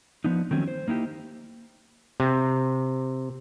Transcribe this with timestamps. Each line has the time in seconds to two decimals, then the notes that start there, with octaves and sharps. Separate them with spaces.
0.24 F3 B3 D4 D#4
0.51 D#3 F3 F#3 A3 C4 C#4
0.68 C5
0.88 A#3 D#4 E4 G4
2.20 C3